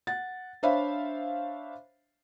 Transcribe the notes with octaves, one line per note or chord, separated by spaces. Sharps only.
F#5 A6
D4 C5 C#5 E5 F5 B5